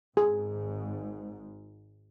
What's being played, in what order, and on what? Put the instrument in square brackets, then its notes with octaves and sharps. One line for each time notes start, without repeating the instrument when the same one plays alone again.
[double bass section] G#1 G#2 [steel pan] G#4